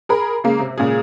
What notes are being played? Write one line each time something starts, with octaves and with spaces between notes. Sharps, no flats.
G#4 A#4 B5
C#3 G#3 A#3
C3
A#2 C#3 G#3 G#4